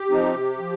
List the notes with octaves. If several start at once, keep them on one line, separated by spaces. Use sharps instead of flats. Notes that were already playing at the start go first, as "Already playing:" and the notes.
Already playing: G4
F3 C4 D#4
C3
F3